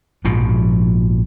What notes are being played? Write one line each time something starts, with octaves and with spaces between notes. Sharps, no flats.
A#1 G#2 B2 F3